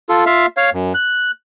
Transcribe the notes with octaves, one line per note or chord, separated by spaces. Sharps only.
F4 A4
F4 E5 F5
C#5 F5
F#2
F#6